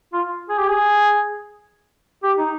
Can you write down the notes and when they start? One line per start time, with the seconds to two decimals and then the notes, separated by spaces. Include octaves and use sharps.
0.13 F4
0.49 G#4
0.58 G4
0.69 G#4
2.23 G4
2.38 D#4